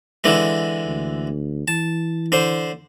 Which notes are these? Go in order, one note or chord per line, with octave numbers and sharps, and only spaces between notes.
D3 E3 G#3
D2
E3 A5
D3 C5